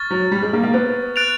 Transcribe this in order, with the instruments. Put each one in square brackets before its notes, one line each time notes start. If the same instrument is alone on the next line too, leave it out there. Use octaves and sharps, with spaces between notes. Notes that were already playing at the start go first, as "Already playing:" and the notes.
Already playing: [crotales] C#6 F6 A6
[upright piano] F#3
G3
G#3
A#3
A#3
B3
[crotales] F#6 A6 D7 F7